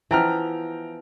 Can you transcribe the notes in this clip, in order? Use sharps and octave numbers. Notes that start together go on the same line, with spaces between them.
E3 F3 B3 G5 A#5 F6